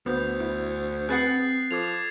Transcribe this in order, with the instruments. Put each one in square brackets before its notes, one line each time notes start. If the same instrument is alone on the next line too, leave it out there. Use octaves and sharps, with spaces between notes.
[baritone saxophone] D2 [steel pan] B3 [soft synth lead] C5 [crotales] D#6 G6
[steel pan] E4
[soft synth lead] C4 [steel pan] G#4 B4 F#5 [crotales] F#6 A6 C7
[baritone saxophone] F3 [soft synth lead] A4 [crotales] D6 G#6 F7